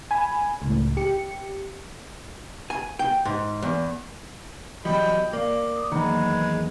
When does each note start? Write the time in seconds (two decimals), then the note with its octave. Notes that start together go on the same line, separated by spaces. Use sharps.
0.11 G#5 B5
0.62 C#2 A2
0.97 G4 C#7
2.70 G#5
2.99 G5
3.25 G#2
3.62 E2
4.85 E2 F#3 G3 D#5 G5 B5
5.33 A#3 D5 F5 D6
5.77 D#6
5.92 E2 D#3 F#3 G#3 A#3 B4